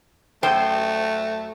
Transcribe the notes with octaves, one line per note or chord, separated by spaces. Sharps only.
F#2 A3 C5 G5